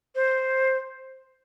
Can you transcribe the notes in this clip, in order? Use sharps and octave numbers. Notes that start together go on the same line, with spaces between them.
C5